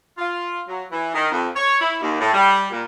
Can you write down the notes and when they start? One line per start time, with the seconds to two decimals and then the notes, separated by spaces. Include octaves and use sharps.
0.18 F4
0.68 F#3
0.92 E3
1.14 D#3
1.32 F2
1.56 C#5
1.81 E4
2.01 D#2
2.21 A2
2.34 G3
2.71 A#2